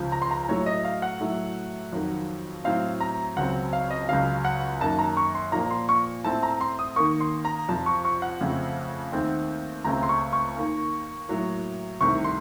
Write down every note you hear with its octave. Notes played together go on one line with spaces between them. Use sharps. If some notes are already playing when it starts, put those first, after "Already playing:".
Already playing: C#2 C#3 F3
A#5
C6
A#5
A2 F#3 A3 C#5
D#5
F5
F#5
A2 F#3 A3
F2 D#3 F#3
A2 F#3 C4 F5
A#5
C#2 C#3 F#3 C4 F#5
F5
D#5
C#2 C#3 F#3 F5
F#5
F#2 D#3 A#3 A5
A#5
C#6
C6
A#2 F3 A#3 A#5
C6
C#6
A2 A3 C4 A5
A#5
C6
D#6
D#2 D#3 A#3 C#6
C6
A#5
F2 C3 F3 A5
C#6
C#6
F#5
F2 C#3 A3 C4
D#2 D#3 A3 C4
C#2 C#3 A3 C4 A#5
C6
C#6
C#6
D#2 D#3 A#3
A2 F#3 A#3
C2 C3 D#3 A3 C#6
C6